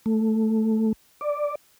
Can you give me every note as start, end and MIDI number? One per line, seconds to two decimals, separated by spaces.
0.06 0.92 57
1.21 1.55 74